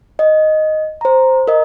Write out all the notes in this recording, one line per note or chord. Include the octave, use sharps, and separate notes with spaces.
D#5
C5 A#5
A#4 D#5